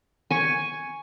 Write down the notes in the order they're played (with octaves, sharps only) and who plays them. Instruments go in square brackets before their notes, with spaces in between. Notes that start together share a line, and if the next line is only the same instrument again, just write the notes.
[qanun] G#5 C#6